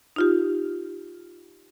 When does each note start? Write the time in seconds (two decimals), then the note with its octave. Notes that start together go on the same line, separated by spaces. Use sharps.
0.16 D#4 F4 G4